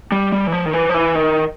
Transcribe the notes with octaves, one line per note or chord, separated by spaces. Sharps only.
G3
G3
E3
F3
D#3
E3
F3
E3
D#3